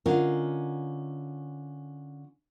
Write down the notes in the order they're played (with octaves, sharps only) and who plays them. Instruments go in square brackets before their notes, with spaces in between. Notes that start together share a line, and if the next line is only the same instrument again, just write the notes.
[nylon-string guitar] D3 C#4 F4 A#4 D#5